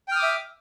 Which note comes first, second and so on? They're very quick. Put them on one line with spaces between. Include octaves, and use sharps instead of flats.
G5 F6 D#6 D6 E5